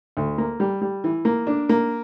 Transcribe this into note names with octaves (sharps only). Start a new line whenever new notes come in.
D2
A#3
G3
G3
E3
A#3
D4
A#3